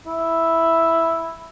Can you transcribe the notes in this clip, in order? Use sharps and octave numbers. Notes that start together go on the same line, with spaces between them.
E4